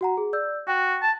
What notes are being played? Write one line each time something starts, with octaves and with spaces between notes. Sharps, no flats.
F#4 F#5 A#5
G#4
D5 E6 G6
F#4 G5
A5